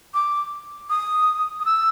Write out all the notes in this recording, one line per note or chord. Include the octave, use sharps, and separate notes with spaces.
D6
D#6
D#6
E6